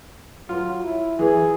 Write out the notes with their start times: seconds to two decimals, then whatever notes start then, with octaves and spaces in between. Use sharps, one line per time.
0.49 F#3 F4
0.84 E4
1.19 E3 G#4